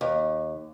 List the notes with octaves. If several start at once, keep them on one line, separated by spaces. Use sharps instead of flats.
D#2